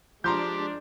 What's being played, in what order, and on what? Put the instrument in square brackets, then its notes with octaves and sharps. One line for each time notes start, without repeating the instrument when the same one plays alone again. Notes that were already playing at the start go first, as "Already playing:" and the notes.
[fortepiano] F3 [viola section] G#3 D4 [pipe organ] G4 [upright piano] A#5 C6 G6